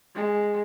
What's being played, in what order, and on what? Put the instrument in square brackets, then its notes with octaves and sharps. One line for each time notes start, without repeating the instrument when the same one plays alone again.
[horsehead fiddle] G#3